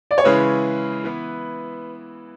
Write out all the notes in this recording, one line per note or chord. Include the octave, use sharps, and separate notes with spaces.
D5
C#5
C#3 E3 G#3 C#4 E4 B4
E3 B3 E4